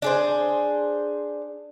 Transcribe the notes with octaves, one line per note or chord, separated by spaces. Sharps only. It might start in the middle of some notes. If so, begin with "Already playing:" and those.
D4 G#4 C5